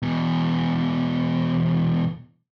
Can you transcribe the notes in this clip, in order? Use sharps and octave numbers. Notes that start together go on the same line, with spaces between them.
E2 B2